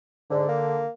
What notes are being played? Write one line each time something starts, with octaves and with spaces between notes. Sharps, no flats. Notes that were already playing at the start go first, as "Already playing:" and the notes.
G#2 D3
A#3